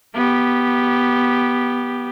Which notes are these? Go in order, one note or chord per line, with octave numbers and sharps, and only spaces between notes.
B3 G4